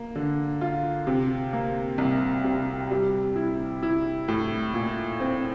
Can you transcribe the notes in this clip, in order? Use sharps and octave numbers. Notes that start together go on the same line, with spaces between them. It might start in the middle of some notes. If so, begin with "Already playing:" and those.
Already playing: A#3
D3
F4
C3
A#3
C2
C3
G3
E4
E4
A2
A#2
C4